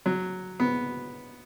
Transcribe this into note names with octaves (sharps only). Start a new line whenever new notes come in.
F#3
B3